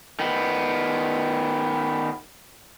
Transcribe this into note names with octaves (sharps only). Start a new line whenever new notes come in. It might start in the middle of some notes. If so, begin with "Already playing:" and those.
D#3 B3